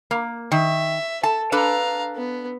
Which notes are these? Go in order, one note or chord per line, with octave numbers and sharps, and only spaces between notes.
A#3
D#3 E5
A4 A5
D4 A4 B4 F5 A#5
B3